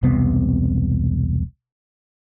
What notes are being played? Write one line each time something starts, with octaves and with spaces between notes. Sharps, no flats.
E1 C2 C3 B3